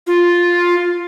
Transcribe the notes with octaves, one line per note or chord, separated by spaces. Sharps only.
F4